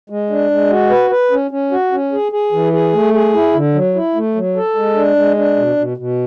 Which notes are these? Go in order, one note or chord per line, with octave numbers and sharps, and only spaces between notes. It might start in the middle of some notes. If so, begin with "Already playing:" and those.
G#3
D4
G#3
F#4
B4
B4
C#4
C#4
F#4
C#4
G#4
G#4
E3
G#4
A3
G#4
E4
D3
F#3
E4
A3
F#3
A4
G#3
D4
G#3
D4
B2
B2
B2